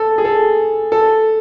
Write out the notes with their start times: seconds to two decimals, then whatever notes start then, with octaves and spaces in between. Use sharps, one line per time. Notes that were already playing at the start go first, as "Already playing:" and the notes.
Already playing: A4
0.18 G#4
0.25 A4
0.92 A4